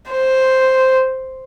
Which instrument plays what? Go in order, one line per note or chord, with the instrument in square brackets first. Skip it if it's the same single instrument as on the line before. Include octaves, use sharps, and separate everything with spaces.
[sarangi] C5